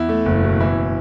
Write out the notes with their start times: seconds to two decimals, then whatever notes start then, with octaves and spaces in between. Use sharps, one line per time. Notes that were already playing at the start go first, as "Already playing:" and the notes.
Already playing: E2 E4
0.09 A3
0.26 F#1
0.44 B2
0.60 E3 E4